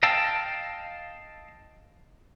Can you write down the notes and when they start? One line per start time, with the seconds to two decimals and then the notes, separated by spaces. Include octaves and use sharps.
0.03 D#5 F5 G5 A5 E6